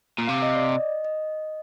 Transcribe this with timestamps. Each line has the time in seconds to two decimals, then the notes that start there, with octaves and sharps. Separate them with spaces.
0.18 A#2
0.27 C3 F5
0.42 D#5
0.55 D5
0.69 D#5
1.05 D#5